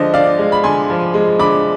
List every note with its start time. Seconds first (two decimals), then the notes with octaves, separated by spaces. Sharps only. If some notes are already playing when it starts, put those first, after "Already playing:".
Already playing: D3 F3 G#3 C5 D#5
0.14 D3 D5 F5
0.39 G#3
0.52 B5
0.64 D3 G#5 C6
0.90 F3
1.14 G#3
1.39 D3 B5 D6